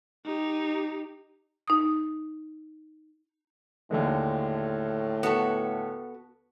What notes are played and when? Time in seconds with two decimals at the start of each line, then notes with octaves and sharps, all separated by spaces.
0.25 D#4 G4
1.68 D#4 D#6
3.91 D#2 A2 D3 G#3
5.23 B3 F#4 A4